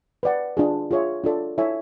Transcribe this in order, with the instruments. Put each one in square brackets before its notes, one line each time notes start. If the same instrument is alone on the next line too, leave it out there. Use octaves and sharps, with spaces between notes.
[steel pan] B4 D5 F#5
D4 F4 G#4
F4 G#4 C#5 E5
D4 F4 A4 D5
E4 A4 C#5 E5 G#5